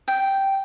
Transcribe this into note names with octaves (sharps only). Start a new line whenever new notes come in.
G5